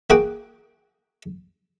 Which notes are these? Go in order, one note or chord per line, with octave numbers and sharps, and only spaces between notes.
A#3 F#4 G#4 F#5 G5